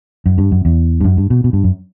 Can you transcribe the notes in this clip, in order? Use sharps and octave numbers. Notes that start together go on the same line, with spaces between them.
F#2
G2
F#2
E2
G2
F#2
G2
B2
B2
G2
F#2